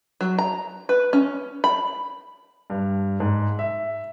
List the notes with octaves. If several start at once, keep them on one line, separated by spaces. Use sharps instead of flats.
F#3
A#5
B4
C#4
B5
G2
G#2
E5